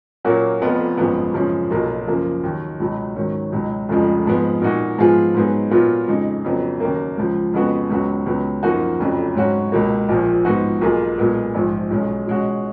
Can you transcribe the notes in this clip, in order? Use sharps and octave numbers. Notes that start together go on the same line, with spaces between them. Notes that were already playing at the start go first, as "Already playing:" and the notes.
A#2 F#3 A#3 C#4 F#4
F1 F2 F3 B3 F4
G#1 F#2 F3 G#3 B3
F#2 C#3 F3 G#3 C#4
B1 B2 F#3 A#3 F4
F#2 C#3 F3 A#3
D#2 D#3 F#3
C#2 B2 F#3
G#2 D#3 F#3 C#4
C#2 B2 F#3
F1 F2 C#3 F3 G#3
G#2 F3 G#3 B3
A#2 G#3 D#4 F#4
G#2 F3 B3 F4 G#4
G#2 F#3 B3 D#4 G#4
A#2 F#3 B3 F4
F2 C#3 G#3 D#4
F2 C#3 F#3 B3
D#2 C#3 F#3 A#3
C#2 C#3 F3
F2 C#3 G#3 B3 F#4
C#2 C#3 F#3 B3 F#4
C#2 C#3 F#3 B3
F#2 F3 A#3 D#4 F#4
F1 F2 C#3 F#3
G#2 F#3 C#4 F#4
C#2 B2 A#3
A#1 A#2 F3
G#2 F3 B3 D#4 F#4
B1 B2 A#3 F4 G#4
B1 A#2 G#3 B3
A#1 G#2 F3
B1 B2 G#3 C#4
B2 G#3 C#4 F#4